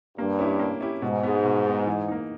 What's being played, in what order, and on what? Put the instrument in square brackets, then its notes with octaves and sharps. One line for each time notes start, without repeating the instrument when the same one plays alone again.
[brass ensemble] G2 [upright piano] A#3
[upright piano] C#4 E4 G4
A#3
C#4 E4 G4
[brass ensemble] G#2 [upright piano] B2
[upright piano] G#3 B3
B2
G#3 B3
E3
A#3 D#4